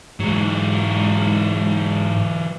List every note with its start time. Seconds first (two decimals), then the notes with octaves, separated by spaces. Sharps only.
0.20 G#2 E3 F#3